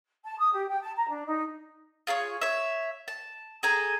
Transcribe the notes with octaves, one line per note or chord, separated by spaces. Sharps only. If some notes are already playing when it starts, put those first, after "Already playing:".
A5
D#6
G4
G5
A5
A#5
D4
D#4
F4 G#4 A4 C#5
C#5 E5
A5
G#4 A4 G#5 A#5